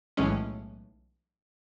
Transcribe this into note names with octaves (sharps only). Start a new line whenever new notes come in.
B1 A2 E3 G#3 C#4